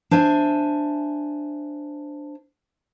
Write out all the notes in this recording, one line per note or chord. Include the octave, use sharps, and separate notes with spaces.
D4 C5 E5 G#5